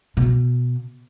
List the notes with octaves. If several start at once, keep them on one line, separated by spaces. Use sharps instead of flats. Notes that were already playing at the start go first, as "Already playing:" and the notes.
B2